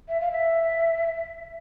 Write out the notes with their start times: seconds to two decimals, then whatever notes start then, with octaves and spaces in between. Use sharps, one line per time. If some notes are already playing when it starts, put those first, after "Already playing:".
0.09 E5
0.21 F5
0.32 E5